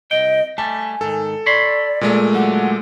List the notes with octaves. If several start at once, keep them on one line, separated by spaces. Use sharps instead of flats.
C2 F2 D#5 G5
G3 A3 G#5 A5
G#2 D#3 A4
C#5 D5 B5 C6
A#2 G#3 A3
D3 F#3 F#5